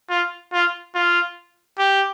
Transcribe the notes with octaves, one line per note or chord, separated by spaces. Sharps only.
F4
F4
F4
G4